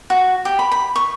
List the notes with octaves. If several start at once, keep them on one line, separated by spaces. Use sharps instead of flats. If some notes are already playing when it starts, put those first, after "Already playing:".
F#4
G4
B5
B5
C#6